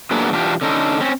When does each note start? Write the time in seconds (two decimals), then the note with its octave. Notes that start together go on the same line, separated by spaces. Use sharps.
0.11 F#3 A#3 B3 D4 G#4
0.31 E2 B2 D4 F4 G4
0.61 D3 C#4 D#4 A4
1.00 C4 C#4